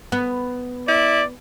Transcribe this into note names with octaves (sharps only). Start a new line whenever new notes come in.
B3
E4 D5